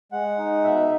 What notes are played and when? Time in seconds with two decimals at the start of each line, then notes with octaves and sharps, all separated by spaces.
0.12 G#3 F#5
0.38 D#4
0.64 B2 E5